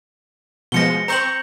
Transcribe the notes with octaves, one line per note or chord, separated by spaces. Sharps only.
B2 F3 G#3 A#6 C#7 G7
C4 C5 A#5 C#6 G6 F#7